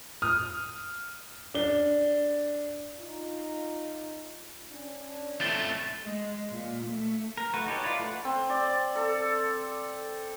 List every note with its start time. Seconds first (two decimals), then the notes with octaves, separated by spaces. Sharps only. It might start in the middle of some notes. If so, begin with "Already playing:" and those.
0.22 D#6 F6
1.54 D4 G7
2.99 D#4 F4
4.70 C#4 D4
5.41 A3 C4 A6 G7
6.03 G#3
6.51 A#2
6.87 A3
7.38 A#4
7.54 A3 F#4 B4
7.67 D#4 G4 A4 C#5
7.84 E4 F4 B4 D5
7.99 A3 F#5
8.25 C4
8.50 D5
8.95 A4